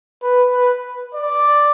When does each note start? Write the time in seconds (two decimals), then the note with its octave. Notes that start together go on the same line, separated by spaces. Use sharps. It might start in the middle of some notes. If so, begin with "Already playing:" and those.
0.22 B4
0.53 B4
1.15 D5